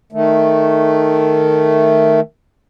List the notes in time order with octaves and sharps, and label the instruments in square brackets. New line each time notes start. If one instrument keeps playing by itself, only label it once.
[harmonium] D#3 A3